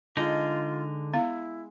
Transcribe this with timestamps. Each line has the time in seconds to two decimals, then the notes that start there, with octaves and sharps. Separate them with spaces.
0.17 D3 G#3 D#4 F4
1.14 B3 E4 F5